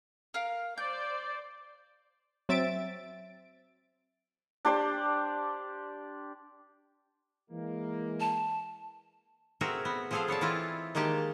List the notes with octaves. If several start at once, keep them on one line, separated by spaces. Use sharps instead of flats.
A#4 F5
C5 D5 G6
F#3 C4 E5 A6 D7
D4 G4 C5 D5
E3 G#3 A#3
A5
C4 F#4 G#4 A#4 E5
B3
F3 C4 G#4 A4 C5 F5
B3 C#5 D5 A5
E3 C4 E4 F4 D#5
D#3 G#3 A#3 G4 A5